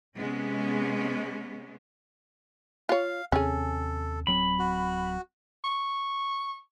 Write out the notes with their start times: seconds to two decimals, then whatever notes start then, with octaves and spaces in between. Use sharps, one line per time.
0.17 C3 G#3 B3 C#4
2.89 F4 C#5 F5
3.32 D#2 C3 C4 C#4 G#4 A4
4.27 D1 F#3 C4 B5
4.59 F#4
5.64 C#6